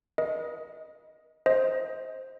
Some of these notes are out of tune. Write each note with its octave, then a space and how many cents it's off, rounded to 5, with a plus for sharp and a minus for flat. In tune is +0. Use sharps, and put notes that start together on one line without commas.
B4 -45 D#5 +5
C5 +5 D#5 +20